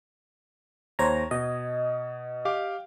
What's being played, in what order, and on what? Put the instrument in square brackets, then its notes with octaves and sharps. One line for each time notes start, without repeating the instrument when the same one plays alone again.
[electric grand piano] D#2 G#6 [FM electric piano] C5 C#5 A#5
[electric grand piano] B2 [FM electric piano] D#5
[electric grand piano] G4 F5 D6